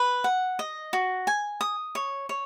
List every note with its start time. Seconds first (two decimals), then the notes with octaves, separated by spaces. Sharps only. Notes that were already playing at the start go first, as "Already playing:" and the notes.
Already playing: B4
0.24 F#5
0.59 D#5
0.93 F#4
1.27 G#5
1.61 D#6
1.95 C#5
2.29 C#5